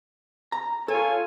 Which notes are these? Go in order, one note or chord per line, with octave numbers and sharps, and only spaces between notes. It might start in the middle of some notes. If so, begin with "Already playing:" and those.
A#5
F4 A4 C#5 G#5